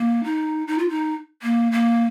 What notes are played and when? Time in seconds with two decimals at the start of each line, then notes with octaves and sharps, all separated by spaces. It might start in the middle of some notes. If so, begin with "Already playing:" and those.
Already playing: A#3
0.24 D#4
0.68 D#4
0.78 F4
0.89 D#4
1.43 A#3
1.72 A#3